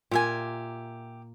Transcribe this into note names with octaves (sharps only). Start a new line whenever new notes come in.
A#2 G4 A#4 E5 G#5